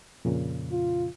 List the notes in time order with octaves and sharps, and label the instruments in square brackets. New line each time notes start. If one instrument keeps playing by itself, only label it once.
[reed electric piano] F2 A#2 C#3
[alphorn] F4